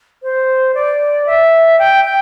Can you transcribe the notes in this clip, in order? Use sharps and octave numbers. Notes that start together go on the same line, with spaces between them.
C5
D5
E5
G5
G5